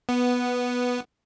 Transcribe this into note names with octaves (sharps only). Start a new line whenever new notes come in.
B3